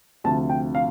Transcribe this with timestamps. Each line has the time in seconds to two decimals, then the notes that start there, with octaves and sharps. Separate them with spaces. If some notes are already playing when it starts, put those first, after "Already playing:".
0.24 D2 C3 F3 A5
0.49 G5
0.75 F5